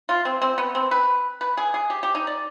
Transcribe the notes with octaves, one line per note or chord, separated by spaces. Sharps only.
F4
C4
C4
B3
C4
B4
B4
G#4
G#4
G4
G4
D#4
D5